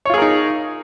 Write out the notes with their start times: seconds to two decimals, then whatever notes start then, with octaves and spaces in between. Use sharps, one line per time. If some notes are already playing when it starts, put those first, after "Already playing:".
0.05 C#5
0.10 F4
0.14 G#4
0.18 A#4
0.22 D#4